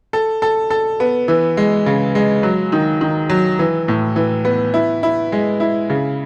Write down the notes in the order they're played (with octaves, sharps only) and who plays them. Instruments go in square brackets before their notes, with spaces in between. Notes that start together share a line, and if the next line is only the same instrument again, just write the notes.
[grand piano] A4
A4
A4
B3
E3
G#3
C#3
G#3
F#3
D#3
D#3
F#3
E3
A2
E3
B3
E4
E4
G#3
E4
C#3